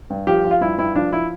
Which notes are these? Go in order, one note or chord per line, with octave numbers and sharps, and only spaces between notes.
G2
F3 G4
F3
F4
G2 E4
G2 E4
F3 D4
F3 E4